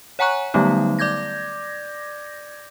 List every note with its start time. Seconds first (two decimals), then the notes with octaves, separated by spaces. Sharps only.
0.19 C#5 F#5 G#5 A#5 C#6 F#6
0.54 D3 F#3 G3 A3 B3 D#4
0.99 D5 D6 G6 G#6 A#6